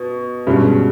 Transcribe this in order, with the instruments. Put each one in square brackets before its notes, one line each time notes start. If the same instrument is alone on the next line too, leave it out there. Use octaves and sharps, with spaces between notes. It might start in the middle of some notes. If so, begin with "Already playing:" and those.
Already playing: [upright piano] B2
[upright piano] G2 [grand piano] B2 G#3 C#4